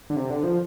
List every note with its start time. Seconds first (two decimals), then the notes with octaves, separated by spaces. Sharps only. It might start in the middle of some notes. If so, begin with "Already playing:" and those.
0.10 D3
0.16 C3
0.30 D3
0.44 F3